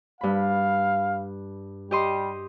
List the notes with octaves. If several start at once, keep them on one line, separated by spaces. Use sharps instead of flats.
G2 F5 B5
G3 G4 D#5 C6